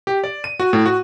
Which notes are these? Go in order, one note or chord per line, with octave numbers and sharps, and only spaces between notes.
G4
D5
D#7
F#4
A2
F#4